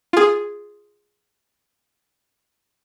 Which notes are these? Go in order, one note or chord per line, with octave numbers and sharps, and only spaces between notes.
F4 G#4